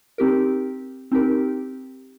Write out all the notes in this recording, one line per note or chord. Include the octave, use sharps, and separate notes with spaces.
C4 D#4 G4 A#4
C4 D#4 G4 A#4